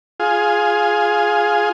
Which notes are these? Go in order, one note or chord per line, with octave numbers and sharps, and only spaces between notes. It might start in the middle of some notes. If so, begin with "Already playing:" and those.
F4 G#4